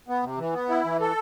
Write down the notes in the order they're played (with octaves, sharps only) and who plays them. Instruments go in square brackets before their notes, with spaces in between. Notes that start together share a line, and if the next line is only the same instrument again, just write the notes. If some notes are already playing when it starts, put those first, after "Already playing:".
[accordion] B3
C3
E3
B3
E4
E3
A4